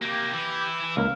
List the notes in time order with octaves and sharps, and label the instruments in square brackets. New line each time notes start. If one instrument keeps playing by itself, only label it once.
[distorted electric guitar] C3 A#3 [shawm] G4
[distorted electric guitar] E3 E4
[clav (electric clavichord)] C#2 A#3 [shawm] F5